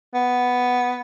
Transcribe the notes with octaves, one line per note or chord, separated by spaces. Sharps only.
B3